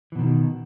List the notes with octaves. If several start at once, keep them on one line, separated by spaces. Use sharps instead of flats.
B2 D#3 E3